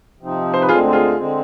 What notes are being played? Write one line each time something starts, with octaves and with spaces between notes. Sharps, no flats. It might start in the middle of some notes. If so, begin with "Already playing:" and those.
C3 F3 C4 D#4
C5
B4
D2 D3 G#3 C4 F4 G#4
F4 G#4
D3 G#3 C4